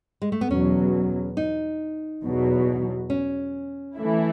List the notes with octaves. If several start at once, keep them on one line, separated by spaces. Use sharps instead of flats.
G#3
A3
B3
E2 B2 F#3 C#4
D#4
E2 B2 F#3
C#4
E3 A3 E4